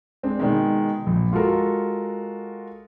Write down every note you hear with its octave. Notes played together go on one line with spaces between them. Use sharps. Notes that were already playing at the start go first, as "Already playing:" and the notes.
G#3 C4 D4
B2 D#3 G#3
A#1
G#3 F4 F#4 A4 A#4